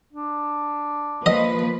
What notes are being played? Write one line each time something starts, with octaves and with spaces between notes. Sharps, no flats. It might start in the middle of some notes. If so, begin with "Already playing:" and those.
D4
F3 A#3 B4 D#5